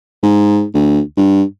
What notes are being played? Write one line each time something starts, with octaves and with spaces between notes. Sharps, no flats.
G#2
D2
G2